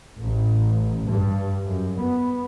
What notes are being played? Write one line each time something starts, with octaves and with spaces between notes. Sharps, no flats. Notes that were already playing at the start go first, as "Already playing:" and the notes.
A1
G2
F#2
B3